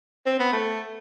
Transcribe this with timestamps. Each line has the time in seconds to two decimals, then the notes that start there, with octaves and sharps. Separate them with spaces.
0.26 C4
0.40 B3
0.53 A3